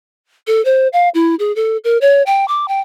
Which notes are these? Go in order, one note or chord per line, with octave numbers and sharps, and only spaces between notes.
A4
C5
F5
E4
G#4
A4
A#4
C#5
G5
D6
G5